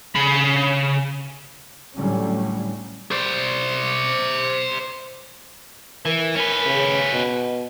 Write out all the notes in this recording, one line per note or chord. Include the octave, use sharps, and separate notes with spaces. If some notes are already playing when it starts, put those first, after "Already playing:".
C#3 B5
A2 D3 F#3 G3 C#4
C5 D5
E3 A#4
C#4 B4
C#3
B2